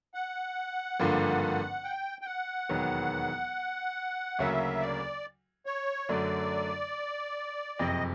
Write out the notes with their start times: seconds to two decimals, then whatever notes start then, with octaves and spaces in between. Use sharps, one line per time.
0.14 F#5
1.00 G#1 G2 D3 F3 A#3
1.84 G5
2.21 G5
2.26 F#5
2.69 E1 D#2 D#3 F#3 B3
4.39 D2 C#3 F#3 A#3 E5
4.81 D5
5.66 C#5
6.09 F#2 D3 F#3 A3 D4 D5
7.79 F#1 F2 C3 D#5